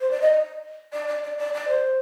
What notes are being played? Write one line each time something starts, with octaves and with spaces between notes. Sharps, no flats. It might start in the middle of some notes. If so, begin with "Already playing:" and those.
C5
D5
D#5
D5
D5
D5
D5
D5
C5